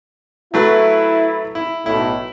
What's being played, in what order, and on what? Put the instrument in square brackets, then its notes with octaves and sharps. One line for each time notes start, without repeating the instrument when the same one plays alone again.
[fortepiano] F#3 A3 B4 [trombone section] E4
[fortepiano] E4
[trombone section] B1 A2 [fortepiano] E4